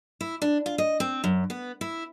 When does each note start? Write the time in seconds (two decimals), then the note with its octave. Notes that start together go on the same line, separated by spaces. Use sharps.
0.21 E4
0.42 D4
0.66 F4
0.78 D#5
1.00 C4
1.24 F#2
1.50 B3
1.81 E4